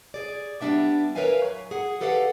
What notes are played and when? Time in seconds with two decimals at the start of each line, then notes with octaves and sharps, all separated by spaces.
0.14 G#4 D5
0.61 G3 B3 D4 E5 G5
1.15 A#4 B4 C#5 E5 F5 G#5
1.44 F#3
1.71 G#4 F#5
2.01 G4 A4 B4 D5 F5 F#5